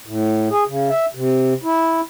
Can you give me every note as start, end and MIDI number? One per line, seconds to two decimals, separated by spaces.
0.06 0.49 45
0.51 0.64 68
0.67 0.90 49
0.90 1.06 76
1.15 1.53 48
1.64 2.01 64